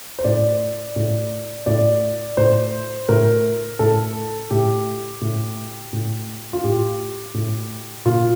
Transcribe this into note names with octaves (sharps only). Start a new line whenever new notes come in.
C5
A2 D5
A2
A2 D5
A2 C5
A2 A#4
A2 A4
A2 G4
A2
A2
F4
A2 G4
A2
A#2 F4